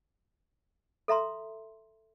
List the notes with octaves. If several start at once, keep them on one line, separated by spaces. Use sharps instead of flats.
A4 E5 A#5 C6